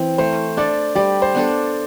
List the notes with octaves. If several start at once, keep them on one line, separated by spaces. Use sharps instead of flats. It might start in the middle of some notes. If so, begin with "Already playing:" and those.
Already playing: E3 C4 E4
A3 C5
D4 A4 D5
G3 D5
C5
B3 D4 A4